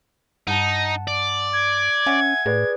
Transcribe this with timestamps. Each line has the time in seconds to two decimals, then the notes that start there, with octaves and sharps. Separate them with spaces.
0.47 G2 D#4 F#5 A5
1.07 D5
1.53 G#6
2.06 C#4 E5 F#5 G#5
2.46 A2 G#4 B4 D5